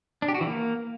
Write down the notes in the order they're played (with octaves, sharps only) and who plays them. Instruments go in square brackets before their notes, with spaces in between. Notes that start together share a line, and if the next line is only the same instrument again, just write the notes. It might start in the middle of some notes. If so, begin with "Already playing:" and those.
[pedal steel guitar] D4
G4
F#4
E3
A#3